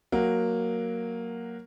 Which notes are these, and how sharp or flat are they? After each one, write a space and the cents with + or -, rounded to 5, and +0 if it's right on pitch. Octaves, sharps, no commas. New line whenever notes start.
F#3 +0 A#3 +0 F#5 -5